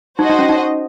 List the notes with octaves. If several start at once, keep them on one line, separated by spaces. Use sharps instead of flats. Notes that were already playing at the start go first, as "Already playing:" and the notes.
D#4 F#4 C5 D#5
D#4
C#4
D#4